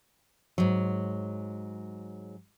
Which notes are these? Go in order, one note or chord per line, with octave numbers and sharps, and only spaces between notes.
G#2 F#3